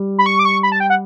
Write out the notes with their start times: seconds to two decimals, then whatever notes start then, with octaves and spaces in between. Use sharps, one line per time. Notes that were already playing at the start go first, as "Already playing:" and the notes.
Already playing: G3
0.19 B5
0.26 C#6
0.39 D6
0.45 C#6
0.63 B5
0.72 A5
0.80 G5
0.90 F#5